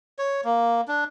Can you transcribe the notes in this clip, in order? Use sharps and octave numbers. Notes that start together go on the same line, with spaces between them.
C#5
A#3
D4